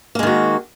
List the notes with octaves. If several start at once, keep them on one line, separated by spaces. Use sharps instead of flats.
D#3 G#3 A#3 F#4